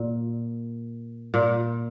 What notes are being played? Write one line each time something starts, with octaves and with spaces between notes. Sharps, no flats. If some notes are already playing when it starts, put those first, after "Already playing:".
Already playing: A#2
A#2